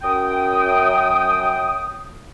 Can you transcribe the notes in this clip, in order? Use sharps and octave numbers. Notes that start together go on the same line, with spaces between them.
F#2 G5 D#6